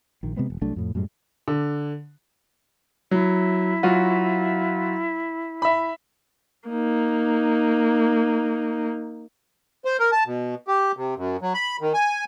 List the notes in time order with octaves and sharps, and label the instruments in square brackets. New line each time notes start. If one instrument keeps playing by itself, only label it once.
[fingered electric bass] A#1 D#3
C3 G#3 B3 C4
E1
C2 F#3 A3 D4
F2 A2
F#2 A2 G3 G#3
[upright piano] D3
[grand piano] F#3 [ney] E4
[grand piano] F#3 F4 F#4
E5 B5
[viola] A#3 D#4
[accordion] C5
A#4
A5
B2
G4
C3
F#2
F#3
B5
D#3
G#5